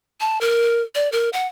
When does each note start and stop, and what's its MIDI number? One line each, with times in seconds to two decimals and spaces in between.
0.21 0.39 81
0.41 0.82 70
0.95 1.10 74
1.12 1.29 70
1.33 1.46 78